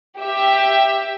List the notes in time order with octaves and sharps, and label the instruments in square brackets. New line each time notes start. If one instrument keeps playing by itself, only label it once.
[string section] G4 E5